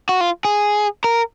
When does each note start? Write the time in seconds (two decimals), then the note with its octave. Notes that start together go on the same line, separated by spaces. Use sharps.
0.09 F#4
0.21 F4
0.45 G#4
1.04 A#4